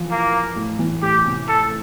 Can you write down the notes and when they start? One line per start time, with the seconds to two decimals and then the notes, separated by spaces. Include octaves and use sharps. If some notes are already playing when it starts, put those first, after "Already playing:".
Already playing: E3 F3
0.11 A#3
0.56 A2
0.79 E3
1.02 A2 G4
1.25 C3
1.48 A4